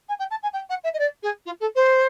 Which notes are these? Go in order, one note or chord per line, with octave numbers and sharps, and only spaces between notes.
G#5
G5
A5
G#5
G5
F#5
E5
D#5
D5
G#4
F4
A4
C5